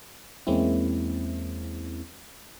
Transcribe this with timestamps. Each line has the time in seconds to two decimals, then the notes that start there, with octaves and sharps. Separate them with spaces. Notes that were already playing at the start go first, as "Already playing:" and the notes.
0.47 E2 G#3 A#3 C4 C#4 E4